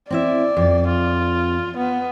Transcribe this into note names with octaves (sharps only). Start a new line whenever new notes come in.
C4 E4 D5 E5
F2
F4
B3